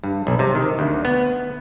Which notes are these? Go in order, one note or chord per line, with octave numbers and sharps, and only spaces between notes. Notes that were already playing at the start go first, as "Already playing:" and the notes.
G2
B1
C3
D#3
D2
B3